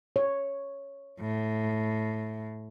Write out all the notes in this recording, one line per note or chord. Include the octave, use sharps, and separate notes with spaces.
C#5
A2